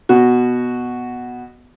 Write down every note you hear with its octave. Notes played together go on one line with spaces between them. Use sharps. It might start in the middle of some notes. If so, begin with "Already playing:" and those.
B2 F#4